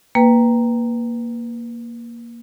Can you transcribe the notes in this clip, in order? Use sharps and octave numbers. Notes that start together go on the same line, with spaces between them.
A#3 B4 G5